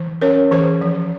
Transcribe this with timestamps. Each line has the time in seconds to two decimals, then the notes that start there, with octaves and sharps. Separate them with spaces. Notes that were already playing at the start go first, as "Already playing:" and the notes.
Already playing: E3
0.21 C#4 A#4 C#5
0.51 E3 G#4 C5
0.81 F3